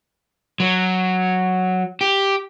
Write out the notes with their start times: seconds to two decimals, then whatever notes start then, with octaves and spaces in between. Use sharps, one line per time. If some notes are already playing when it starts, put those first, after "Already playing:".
0.60 F#3
2.01 G4